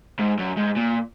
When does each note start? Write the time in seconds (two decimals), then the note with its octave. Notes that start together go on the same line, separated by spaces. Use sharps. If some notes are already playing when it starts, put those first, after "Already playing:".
0.19 G#2
0.39 F#2
0.57 G#2
0.77 A#2